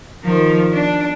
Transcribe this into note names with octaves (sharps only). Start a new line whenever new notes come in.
D#3 F3
D4